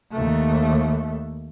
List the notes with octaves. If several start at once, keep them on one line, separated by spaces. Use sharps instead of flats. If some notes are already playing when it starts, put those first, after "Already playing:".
D#2 A3